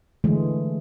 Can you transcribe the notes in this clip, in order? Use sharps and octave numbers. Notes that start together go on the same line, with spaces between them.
D3 E3 G#3 A3